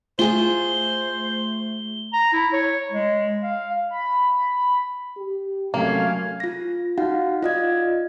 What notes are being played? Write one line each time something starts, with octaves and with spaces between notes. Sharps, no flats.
A3 F4 G#4 C5 G7
A#5
E4
C#5
G#3
F5
B5
G4
C3 F#3 A3 A#3 C#4 F5
F4 A#6
D#4 F#4 F5 F#5
F4 D5 D#5 F5 G#6